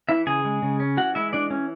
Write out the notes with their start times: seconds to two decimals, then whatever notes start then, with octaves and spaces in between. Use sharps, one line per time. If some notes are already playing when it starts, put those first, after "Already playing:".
0.09 E3 E4 E5
0.26 C#3 G#4 G#5
0.45 G#3
0.62 C#3
0.80 C#4
0.97 E3 F#4 F#5
1.15 G#3 E4 E5
1.33 E3 D4 D5
1.51 C#4